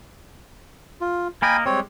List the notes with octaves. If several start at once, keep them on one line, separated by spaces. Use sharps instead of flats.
F4
A#3 A#4 D#5 G5 G#5 B5
G3 G#3 C4 C#5